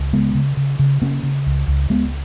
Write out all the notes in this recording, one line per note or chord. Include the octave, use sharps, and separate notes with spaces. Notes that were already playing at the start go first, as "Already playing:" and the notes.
Already playing: C#2
C#3 G#3 B3
C#3
C#3
C#3
C#3 A#3 C#4
C#3
C#2
C#2
C#2 G#3 B3